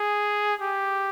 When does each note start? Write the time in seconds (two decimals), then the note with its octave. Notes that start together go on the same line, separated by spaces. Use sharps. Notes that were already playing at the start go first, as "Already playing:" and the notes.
Already playing: G#4
0.62 G4